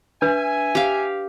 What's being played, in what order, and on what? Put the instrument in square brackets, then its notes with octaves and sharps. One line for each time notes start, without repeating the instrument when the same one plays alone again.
[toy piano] D4 B4 [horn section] E5 G#5
[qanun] G4 F5